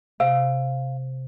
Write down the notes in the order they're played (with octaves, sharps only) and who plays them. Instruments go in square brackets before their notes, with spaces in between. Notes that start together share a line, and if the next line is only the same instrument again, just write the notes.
[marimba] C3 [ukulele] F5